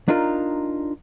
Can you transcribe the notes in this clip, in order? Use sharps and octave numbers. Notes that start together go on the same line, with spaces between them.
D4 D#4 F4 A#4